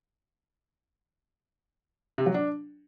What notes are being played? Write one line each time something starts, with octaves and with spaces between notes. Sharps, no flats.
C3
F#3
D4